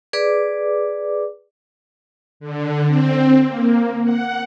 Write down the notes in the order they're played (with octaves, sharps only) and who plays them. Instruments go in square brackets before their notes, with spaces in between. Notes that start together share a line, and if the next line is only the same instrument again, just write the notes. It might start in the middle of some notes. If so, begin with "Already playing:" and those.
[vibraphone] G#4 B4 D5 D6
[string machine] D3
C4
A#3
F#5